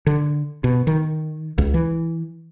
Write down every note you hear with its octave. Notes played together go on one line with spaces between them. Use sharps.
D3
B2
D#3
C#2
E3